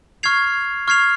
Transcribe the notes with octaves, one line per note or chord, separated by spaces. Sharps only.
C#6 F6 G#6 C7 F7
C#6 F6 G#6 C7 F7